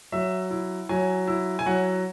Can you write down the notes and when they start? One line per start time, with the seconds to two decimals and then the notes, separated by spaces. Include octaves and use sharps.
0.12 F#3 E5
0.51 E4
0.89 F#3 G#5
1.27 E4
1.59 G#5
1.66 F#3 F#5